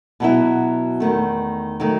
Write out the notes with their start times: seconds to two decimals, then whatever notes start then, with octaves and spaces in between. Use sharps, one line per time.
0.20 B2 F#3 B3 E4
1.00 E2 D#3 A3
1.80 D#3 F#3 A3